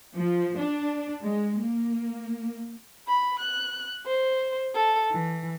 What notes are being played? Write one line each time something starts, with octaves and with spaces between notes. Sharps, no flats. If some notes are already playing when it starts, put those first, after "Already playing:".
F3
D4
G#3
A#3
B5
F#6
C5
A4
E3